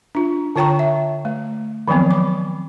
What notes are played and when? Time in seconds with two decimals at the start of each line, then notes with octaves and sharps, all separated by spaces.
0.15 D4 F4
0.56 D3 F4 C#5 G5 A#5 C#6
0.79 E5
1.25 A3
1.88 D#3 F3 F#3 B3 C4
2.06 F#3 D6